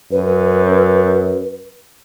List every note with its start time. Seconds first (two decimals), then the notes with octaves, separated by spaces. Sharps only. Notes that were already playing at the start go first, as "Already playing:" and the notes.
0.12 F#2 B4